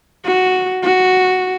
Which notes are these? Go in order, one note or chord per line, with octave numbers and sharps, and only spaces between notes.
F#4
F#4